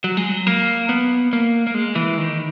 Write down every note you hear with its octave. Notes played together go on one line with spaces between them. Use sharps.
F#3
G#3
F#3
A#3
B3
A#3
A#3
G#3
E3
D#3